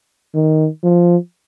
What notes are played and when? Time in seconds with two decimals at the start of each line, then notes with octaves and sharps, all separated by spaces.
0.34 D#3
0.83 F3